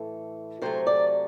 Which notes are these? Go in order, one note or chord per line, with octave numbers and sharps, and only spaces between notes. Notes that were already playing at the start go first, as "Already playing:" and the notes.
Already playing: A2 E3 A3
C3 F#3 A3 C5
D5